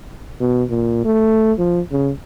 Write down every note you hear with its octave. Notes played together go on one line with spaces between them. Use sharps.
B2
A#2
A3
F3
C#3